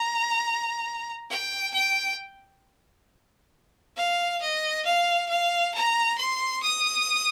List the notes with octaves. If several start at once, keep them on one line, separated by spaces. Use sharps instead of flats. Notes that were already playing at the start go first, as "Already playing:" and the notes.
Already playing: A#5
G5
G5
F5
D#5
F5
F5
A#5
C6
D#6